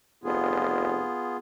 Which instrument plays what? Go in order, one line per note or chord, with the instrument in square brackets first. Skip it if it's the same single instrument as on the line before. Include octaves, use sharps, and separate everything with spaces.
[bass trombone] F1 [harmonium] B3 F4 G#4